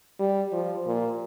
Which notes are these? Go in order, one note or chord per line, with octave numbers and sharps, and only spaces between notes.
G3
F3
A#2